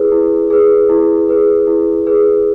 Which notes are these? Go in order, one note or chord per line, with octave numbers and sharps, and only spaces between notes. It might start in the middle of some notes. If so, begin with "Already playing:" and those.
Already playing: E4 G#4 B4
E4
G#4 B4
E4
G#4 B4
E4
G#4 B4